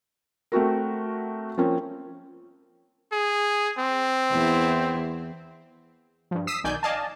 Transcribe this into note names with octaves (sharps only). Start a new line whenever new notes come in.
A3 C4 F#4 A#4
F3 A#3 C4 C#4
G#4
C4
E2 E4
G2 F3
D#6 E6 B6 C7 E7
B1 D#3 D5 G#5 G6
D5 D#5 F5 G#5 A5